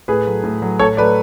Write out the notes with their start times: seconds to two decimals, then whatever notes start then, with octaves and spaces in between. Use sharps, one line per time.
0.08 A2 G#4 B4
0.27 F#3 A3
0.44 A2
0.62 F#3 A3
0.79 A2 A4 C#5
0.97 F#3 A3 B4 D5